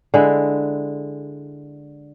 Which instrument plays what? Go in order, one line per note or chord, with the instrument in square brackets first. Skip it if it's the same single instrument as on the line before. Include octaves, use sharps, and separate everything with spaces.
[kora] D3 G#3 E4